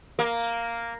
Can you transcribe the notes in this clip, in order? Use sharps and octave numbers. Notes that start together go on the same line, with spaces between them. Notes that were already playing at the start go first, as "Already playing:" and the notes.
A#3